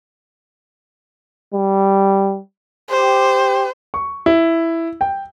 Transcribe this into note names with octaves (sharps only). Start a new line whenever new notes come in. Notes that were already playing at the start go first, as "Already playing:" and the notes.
G3
G4 C5
C#6
E4
G5